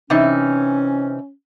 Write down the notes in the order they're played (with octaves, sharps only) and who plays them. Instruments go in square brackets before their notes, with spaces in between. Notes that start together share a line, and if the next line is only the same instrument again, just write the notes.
[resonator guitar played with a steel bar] C3 E3 D#4 [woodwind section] C#4